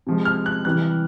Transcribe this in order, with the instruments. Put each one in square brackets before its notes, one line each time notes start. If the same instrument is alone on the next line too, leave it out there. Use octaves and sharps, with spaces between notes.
[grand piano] C3 F3 G#3
F6
F#6
C3 E3 G3 F#6